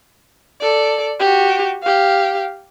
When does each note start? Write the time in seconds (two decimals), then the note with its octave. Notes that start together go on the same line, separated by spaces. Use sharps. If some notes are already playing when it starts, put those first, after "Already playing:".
0.61 A4 D5
1.20 F#4 G4
1.83 G4 F5